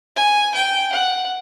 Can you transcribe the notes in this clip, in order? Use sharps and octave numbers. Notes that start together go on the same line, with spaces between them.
G#5
G5
F#5